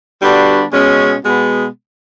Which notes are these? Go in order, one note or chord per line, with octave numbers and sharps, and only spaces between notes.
D3 G3 B3 D4 F#4
B2 G#3 C#4
B2 G#3 B3